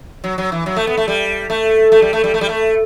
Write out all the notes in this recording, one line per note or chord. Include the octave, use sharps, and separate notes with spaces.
F#3
F#3
E3
F#3
A3
B3
A3
G3
A3
A3
G3
A3
G3
A3
G3
A3